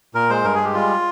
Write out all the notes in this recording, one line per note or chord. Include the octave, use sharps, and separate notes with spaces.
A#2 A#4
G#3 C5
G2 A#4
G#3 G#4
G4
G3 F4